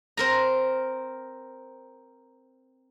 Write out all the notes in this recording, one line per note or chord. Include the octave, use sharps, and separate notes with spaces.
C4 A#4 A#5